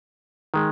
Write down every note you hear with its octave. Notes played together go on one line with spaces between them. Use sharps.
D#3 G#3